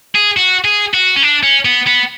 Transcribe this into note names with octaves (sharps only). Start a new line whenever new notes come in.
G#4
F#4
G#4
F#4
C#4
D4
C#4
B3
B3